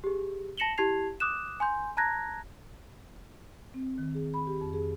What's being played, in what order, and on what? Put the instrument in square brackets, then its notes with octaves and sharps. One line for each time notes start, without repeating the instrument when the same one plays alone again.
[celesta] G4 G#4
A5 A#6 C#7 E7 F#7 G7
E4 G4 A5 G#6 C7 F7
D6 D#6 F#6 E7
G#5 C6 G6
A5 A#5 F#6 G#6 A#6
[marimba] C4
D#3
G#4
B5
G4
F2
G#4